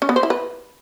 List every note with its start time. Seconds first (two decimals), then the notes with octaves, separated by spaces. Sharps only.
0.02 C#4
0.09 B3
0.16 C5
0.23 E4
0.30 B4